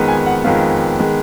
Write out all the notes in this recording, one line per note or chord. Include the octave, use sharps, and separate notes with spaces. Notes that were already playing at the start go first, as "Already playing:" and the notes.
Already playing: F2 D#3 G#3 B3
G#5
F#5
F2 D#3 G#3 B3 F5
D#3 G#3 B3